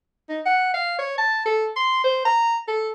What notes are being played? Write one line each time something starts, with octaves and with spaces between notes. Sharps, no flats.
D#4
F#5
F5
C#5
A5
A4
C6
C5
A#5
A4